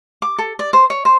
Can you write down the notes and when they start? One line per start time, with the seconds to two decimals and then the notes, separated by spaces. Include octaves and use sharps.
0.22 D6
0.38 A4
0.59 D5
0.73 C5
0.90 C#5
1.05 C5